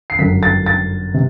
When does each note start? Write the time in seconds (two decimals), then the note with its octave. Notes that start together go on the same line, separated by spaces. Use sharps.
0.10 C7
0.19 G1 F#2 D3 B6
0.43 A6
0.66 A6
1.14 C3